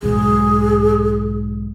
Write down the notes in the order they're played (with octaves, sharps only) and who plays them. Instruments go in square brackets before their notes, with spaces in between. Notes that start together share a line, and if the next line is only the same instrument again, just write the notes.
[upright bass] B1 G#2 [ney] G#4